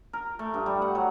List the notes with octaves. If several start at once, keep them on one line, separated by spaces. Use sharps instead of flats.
A#4
A3
G2
G3
F#5
F#3